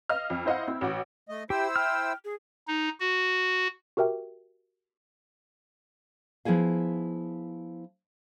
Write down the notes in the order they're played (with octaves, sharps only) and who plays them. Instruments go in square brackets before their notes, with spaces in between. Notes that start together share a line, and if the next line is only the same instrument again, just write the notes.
[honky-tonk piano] D#5 F5 F6
F2
E4 C5 D#5 F5 F#5
C4 E4
A1 F#4 D6
[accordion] A3 D#5
[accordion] E4 C5 E6 [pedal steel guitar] G4 [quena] G5
[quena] G5 [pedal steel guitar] F6
[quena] G#4
[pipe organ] D#4
F#4
[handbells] F#4 G4 A#4 E5 G5
[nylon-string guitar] F3 B3 E4 G#4 F5